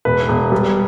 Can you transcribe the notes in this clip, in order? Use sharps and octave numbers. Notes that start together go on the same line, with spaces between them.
E1 B4
E1
G3